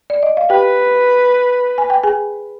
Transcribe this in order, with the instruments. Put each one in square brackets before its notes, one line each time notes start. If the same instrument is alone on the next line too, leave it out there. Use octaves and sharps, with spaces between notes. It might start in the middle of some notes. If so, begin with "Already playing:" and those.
[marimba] D5
D#5
F5
[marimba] G4 G5 [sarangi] B4
[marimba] G#5
G5
G#4 G#5